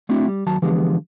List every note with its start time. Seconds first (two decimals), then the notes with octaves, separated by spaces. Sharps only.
0.09 A3 C4 D4 E4 F#4
0.28 G3
0.46 D#2 F#3 A5
0.62 D3 E3 F3 G#3 B3 G4